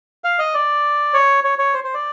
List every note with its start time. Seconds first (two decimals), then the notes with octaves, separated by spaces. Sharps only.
0.24 F5
0.39 D#5
0.54 D5
1.14 C#5
1.44 C#5
1.59 C#5
1.74 C5
1.84 C5
1.94 D5